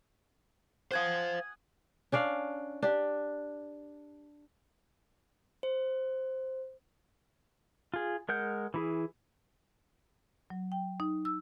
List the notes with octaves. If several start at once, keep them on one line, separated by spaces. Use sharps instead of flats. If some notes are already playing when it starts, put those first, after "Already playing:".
C5 F5 F#5 G#5 D#6
C#4 D4 D5 F5
D4 G4
C5
F4 G#4
G#3 A#4 F#5 G6
E3 E4 G#4
F#3
G5
D#4
E6